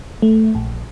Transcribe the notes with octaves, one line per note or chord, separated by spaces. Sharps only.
A3
A#1